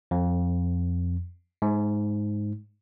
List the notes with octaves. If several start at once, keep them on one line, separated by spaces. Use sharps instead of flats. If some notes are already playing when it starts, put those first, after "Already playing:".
F2
G#2